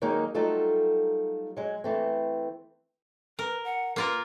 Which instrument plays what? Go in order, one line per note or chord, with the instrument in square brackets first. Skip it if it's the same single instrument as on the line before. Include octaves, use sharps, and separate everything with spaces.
[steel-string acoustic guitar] D#3 F#3 G#3 A#3 D#4
F#3 G3 A3 D#4 F4 A4
F#3 G#3
E3 A3 C4
[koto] A#4 [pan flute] B4
[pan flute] F#5
[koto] A#3 F4 A#4 [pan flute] B4